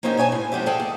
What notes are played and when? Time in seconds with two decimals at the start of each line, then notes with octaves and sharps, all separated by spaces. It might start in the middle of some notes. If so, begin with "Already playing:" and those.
0.03 A#3 C4 C#4 D#4 G4 A#4
0.17 B2 C#5 G#5 A5
0.32 A2
0.52 F3 G#3 B3 G4 E5
0.66 G#4 A4 F5 G5 A5
0.80 D#2